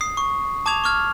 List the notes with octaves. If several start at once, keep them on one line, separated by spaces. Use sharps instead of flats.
D#6 C7
C#6
A5 D6 D#6 G#6 F7
C#6 D6 F6 G#6